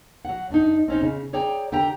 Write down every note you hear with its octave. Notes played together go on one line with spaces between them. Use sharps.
F#3 F#5
F#2 D4 D#4
C4 C#4 D#4
C#3
G#4 C#5 D5 G5 A#5
D3 G4 G5 A#5